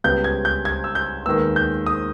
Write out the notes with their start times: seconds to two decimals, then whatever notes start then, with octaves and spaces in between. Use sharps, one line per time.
0.04 C#2 C#3 G3 B3 G6
0.24 G#6
0.45 G6
0.65 G#6
0.84 E6
0.95 G6
1.26 D#2 D#3 G#3 B3 E6
1.56 G6
1.86 D#6